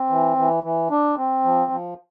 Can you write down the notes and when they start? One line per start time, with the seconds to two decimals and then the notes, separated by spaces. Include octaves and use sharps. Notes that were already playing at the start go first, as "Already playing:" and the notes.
Already playing: C4
0.10 E3
0.38 E3
0.64 E3
0.91 D4
1.17 C4
1.45 F3
1.72 F3